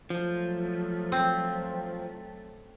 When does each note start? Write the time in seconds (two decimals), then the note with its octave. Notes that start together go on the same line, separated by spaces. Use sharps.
0.10 F3 F#3 A3
1.12 C4